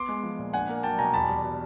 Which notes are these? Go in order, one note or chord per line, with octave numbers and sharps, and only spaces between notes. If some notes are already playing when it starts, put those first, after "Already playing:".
Already playing: B3 C6 D6
G#3
F3
A#2
D4 F#5 G#5
A#3
F#3 G5 A5
B2 G#5 A#5
E2 A5 B5
G3
B2